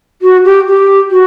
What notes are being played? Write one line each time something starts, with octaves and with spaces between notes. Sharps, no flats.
F#4
G4
G4
F#4